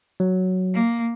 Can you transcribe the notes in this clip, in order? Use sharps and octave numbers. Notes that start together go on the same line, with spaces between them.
F#3
A#3